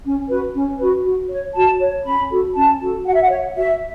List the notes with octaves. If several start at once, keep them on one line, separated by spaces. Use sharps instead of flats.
C#4
F#4 B4
C#4
F#4 B4
F#4
C#5
F#4 A5
C#5
C#4 B5
F#4 A4
C#4 A5
F#4 A4
F#4 F#5
E5
F#5
C#5
F#4 E5